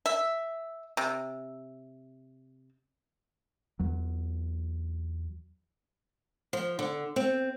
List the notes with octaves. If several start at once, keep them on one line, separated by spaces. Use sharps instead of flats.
E5
C3
E2 F#3
F3
D3
C4